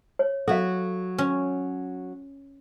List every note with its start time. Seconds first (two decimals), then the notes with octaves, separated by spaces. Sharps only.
0.19 C#5
0.48 F#3 F#4 A4 F5
1.18 C#4